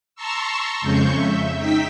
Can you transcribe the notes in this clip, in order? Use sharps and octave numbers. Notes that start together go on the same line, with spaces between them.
A5 A#5 C6 C#6 E6
F2 C#3 G#3 C#6 G6
E5
D#4 G5 E6 B6